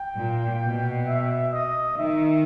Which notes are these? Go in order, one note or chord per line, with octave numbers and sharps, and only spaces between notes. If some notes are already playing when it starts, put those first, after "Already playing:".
Already playing: G5
A#2
B2
E5
D#5
D#3 E5